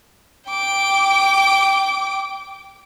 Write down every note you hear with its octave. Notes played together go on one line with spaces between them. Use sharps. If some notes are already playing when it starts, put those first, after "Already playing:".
G5 D6